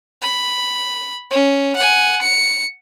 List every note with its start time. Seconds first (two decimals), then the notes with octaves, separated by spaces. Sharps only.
0.22 B5
1.31 C#4
1.76 F#5 G#5
2.22 C#7